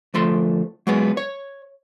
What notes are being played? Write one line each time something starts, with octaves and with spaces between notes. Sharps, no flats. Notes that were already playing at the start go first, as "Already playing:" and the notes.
D2 F3 A3 C6
F#3 G#3 B3
C#5